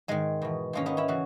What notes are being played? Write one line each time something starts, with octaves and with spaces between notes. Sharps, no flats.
G#2 D#3 G#3
E2 B2
G#2 D#3 A#3 C#4
B3 D#4
C#4 E4
C#3 E3 F#4